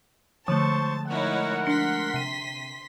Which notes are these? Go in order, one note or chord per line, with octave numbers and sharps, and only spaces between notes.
D3 F3 G#3 A3 C5 A5 C#6
D#4 E4 A#4 C#5 F#5
D4 C6 B6
C3 D#7